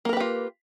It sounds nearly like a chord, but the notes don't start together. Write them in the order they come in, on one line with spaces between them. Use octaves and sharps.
A#3 A#4 B4 G4 F4